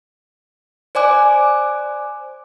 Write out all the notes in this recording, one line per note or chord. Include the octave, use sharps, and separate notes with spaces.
C5 D5 G#5 D6 F#6